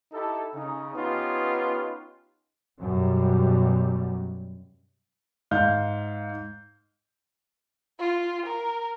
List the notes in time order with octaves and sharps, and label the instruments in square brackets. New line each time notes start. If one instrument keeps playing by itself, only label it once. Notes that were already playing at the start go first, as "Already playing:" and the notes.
[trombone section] D#4 E4 G4 A4
C#3 D#4
B3 C#4 D#4 F4 G4 B4
[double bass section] F#2 B2 G3
[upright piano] G#2 F5 G6
[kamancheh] F4
A#4